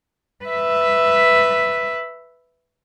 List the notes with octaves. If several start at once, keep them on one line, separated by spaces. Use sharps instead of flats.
B4 E5